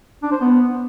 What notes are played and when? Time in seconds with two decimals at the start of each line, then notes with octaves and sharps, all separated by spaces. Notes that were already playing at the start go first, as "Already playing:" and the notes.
0.23 D4
0.32 C5
0.41 B3